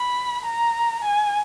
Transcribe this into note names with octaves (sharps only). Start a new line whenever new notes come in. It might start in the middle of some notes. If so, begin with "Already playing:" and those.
Already playing: B5
A#5
G#5